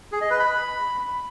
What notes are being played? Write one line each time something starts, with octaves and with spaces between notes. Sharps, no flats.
G#4
D#5
B4
B5